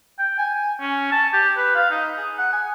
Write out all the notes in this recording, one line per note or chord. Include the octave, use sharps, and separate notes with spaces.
G5
G#5
C#4
A5
G4
B4
F5
D#4
G#4
F#5
G#5